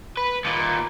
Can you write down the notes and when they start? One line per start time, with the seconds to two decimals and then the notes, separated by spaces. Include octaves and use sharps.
0.17 B4
0.45 D#2 A#2